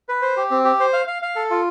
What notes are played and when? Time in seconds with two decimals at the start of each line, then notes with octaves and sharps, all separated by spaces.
0.09 B4
0.22 C5
0.37 G4
0.51 C4
0.65 G4
0.80 C5
0.93 F5
1.07 F5
1.22 F5
1.36 A4
1.50 F4